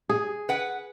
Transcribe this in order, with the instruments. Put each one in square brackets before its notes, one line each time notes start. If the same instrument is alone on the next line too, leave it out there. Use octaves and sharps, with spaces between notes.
[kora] G#4
[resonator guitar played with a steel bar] B4 F#5